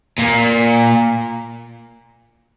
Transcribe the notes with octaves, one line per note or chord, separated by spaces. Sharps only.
A#2